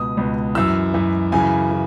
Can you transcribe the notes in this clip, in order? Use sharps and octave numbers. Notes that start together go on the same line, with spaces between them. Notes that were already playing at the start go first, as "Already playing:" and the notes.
Already playing: C#2 B2 D#6
C#2 B2
F#2 E3 E6
F#2 E3
F#2 C#3 E3 G#5
E3